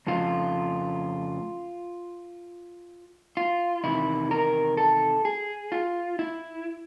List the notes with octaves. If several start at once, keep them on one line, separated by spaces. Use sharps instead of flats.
F2 C#3 F3 A3 F4
F4
E2 C3 D#3 E4
A#4
A4
G#4
F4
E4